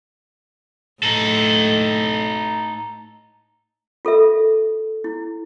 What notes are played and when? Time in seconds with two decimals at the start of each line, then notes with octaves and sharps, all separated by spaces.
1.03 A2 D#4 A4
4.05 F4 A4 A#4 E5
5.04 E4